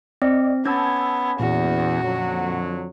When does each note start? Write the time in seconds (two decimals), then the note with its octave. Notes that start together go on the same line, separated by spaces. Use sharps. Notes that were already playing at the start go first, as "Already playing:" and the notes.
0.22 C4 D5 D#5
0.65 B3 C#4 A5 E6 G#6
1.40 E2 A#2 F#4
2.03 F2 D3 F#3